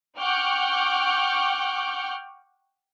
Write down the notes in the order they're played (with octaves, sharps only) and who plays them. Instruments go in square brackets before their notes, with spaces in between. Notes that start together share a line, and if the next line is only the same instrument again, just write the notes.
[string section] F#5 G5 C#6 D6 F6 G6